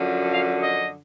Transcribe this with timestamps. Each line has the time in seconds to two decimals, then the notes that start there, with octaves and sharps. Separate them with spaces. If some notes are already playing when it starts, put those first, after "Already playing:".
Already playing: F#2 D3 F3
0.31 F5
0.61 D#5